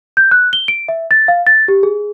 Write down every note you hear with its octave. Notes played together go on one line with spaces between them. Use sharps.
G6
F#6
G7
D7
E5
A6
F5
A6
G4
G#4